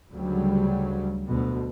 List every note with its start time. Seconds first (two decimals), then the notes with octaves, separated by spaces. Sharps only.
0.13 D2 C#3 F#3 G3
1.29 D2 B2